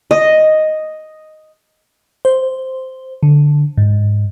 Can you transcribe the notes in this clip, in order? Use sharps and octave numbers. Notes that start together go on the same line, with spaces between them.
D#5
C5
D3
G#2